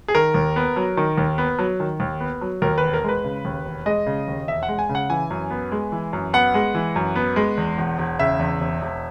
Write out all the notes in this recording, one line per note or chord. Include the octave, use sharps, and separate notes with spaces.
G#4
D#3 A#4
D#2
B3
F#3
D#3
D#2
B3
F#3
D#3
D#2
B3
F#3
D#2 A#4
E1 B4
A#4
G#3 B4
C#3
D#2
E1
G#3 D#5
C#3
D#2
E1 E5
F#5
G#3
G#5
C#3
F#5
E3 G#5
F#2
B3
G#3
E3
F#2
B3 F#5
G#3
E3
F#2
B3
G#3
E2
E1
E1
C#3 E5
E2
E1
E1